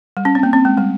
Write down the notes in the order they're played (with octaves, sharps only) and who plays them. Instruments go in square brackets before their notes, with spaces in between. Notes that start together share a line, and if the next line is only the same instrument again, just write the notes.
[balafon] G3
C#4
C4
A#3
C4
G#3
G3